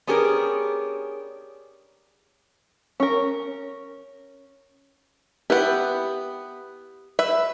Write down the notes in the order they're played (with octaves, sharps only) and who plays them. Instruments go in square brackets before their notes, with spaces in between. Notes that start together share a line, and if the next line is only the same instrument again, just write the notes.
[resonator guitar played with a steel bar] B3 C#4 D4 G4 G#4 A#4
[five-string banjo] C#4 A#4
[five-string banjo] B3 E4 [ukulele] G4 B4
[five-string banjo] B4 E5